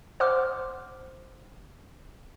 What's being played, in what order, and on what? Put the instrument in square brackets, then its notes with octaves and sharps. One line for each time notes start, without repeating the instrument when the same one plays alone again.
[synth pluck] C5 F#5 C6 D6 F6